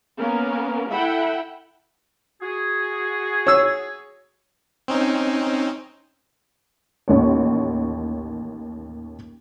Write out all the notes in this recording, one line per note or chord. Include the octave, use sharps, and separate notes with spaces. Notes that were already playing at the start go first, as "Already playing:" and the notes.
A#3 B3 C#4 A#4
E4 A4 E5 F#5 G5 B5
F#4 G#4
C#5 E6
C4 C#4 D#4
A1 D#2 C#5